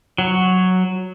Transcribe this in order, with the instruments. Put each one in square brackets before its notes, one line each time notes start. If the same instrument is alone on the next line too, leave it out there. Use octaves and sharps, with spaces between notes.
[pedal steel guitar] F#3